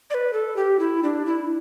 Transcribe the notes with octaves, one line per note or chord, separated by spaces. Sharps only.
D5
B4
A4
G4
E4
D4
E4